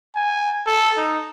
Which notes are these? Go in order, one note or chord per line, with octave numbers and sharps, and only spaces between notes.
G#5
A4
D#4